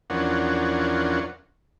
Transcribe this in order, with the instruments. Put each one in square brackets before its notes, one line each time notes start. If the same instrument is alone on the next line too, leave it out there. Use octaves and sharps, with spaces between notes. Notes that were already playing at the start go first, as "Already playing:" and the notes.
[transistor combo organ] E2 F3 C#4 D4 A#4 F#5